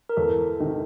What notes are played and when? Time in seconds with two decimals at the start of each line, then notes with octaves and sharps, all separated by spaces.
0.09 A#4
0.17 E2 A4
0.60 C3 D#3